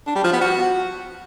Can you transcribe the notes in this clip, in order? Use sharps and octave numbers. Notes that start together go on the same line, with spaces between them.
D4
G3
F3
B3
F#4